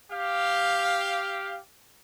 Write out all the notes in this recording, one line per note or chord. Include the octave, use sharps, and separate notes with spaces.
G4 F5